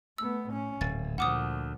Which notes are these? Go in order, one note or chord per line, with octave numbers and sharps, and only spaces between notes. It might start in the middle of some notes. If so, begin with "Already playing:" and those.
A3 B3 E6
A2 C#4
D1 G#1 A6
D2 A#2 F3 F#5 D6 D#6